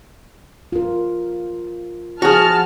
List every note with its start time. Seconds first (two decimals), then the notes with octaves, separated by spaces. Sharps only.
0.72 F4 A#4
2.22 F3 F#4 G#4 A5 F6